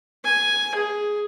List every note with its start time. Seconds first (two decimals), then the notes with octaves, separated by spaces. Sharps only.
0.25 G#5
0.75 G#4